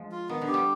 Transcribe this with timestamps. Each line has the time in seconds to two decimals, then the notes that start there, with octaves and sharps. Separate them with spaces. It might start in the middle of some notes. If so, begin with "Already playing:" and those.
Already playing: F3 G#3
0.12 F4
0.29 D#3 B3
0.42 D3
0.48 G4
0.54 G3